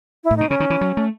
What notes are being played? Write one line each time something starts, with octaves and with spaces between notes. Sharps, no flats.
E4
A2
B2 D#4
C#3 C#4
D#3
E3
F#3
A3